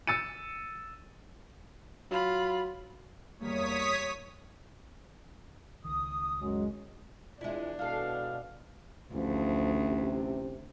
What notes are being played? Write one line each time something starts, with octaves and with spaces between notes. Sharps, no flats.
E6 A6 C#7 D#7
F#3 F4 B5
E2 G3 A#3 C#5 D#6 B6
C#2 D#3 D#6
F#2 F#3 G#3
E2 G#3 D4 E4 F4
B2 G#3 A4 F5
A1 D2 F3
C3